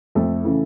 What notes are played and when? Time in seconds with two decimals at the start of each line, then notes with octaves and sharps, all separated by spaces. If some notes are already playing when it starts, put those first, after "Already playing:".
0.15 F2 A3 A4
0.44 C#3 E3